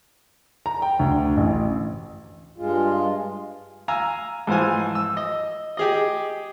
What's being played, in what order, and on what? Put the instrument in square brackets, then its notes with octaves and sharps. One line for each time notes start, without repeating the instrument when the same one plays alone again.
[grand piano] A#5
G5
D2
A1
[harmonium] G2 G#3 F4
[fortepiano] F5 G#5 A#5 E6
G#2 E3 F3 C5 F5 G#5
E6
D#5
G4 G#4 D#5